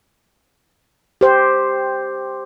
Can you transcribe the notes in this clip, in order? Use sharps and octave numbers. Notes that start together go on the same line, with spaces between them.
G4 C5